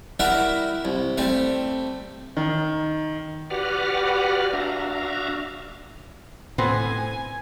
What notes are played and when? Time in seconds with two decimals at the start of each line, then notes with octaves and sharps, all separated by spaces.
0.19 G3 E4 F#4 A#4 E5
0.85 C2
1.18 G3 A3 C4
2.37 D#3
3.50 F#4 G4 B4 D5 F#5 F6
4.53 D4 F#4 E5 F5 A#5
6.58 A2 B3 C4 G#5